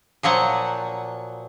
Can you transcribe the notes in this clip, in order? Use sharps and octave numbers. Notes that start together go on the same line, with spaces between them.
A#2 F3 F#3 F#5